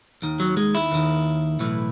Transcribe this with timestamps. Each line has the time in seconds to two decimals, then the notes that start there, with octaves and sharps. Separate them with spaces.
0.22 D#2 D#3
0.40 F#3
0.57 G#3
0.75 E4
0.92 D#2 D#3
1.59 B1 A2 E3